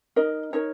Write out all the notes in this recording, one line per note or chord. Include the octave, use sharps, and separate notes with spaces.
D#4 A#4 D#5
D#4 A#4 C#5